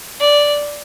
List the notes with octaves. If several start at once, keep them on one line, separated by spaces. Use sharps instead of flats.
D5